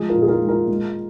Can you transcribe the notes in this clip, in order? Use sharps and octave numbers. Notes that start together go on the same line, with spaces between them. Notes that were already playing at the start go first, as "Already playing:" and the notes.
Already playing: F3 G#3 G#4
F4 A#4
A#2
G#4
F4 A#4
G#3
F4 A#4
G#3